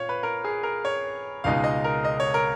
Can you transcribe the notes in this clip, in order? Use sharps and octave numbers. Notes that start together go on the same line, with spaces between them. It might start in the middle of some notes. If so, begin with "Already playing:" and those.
Already playing: A#2 C#5 F5
B4
A#4
G#4
A#4
C#5
C#2 B2 G#3 D#4 F5
D#5
A#4
D#5
C#5
A#4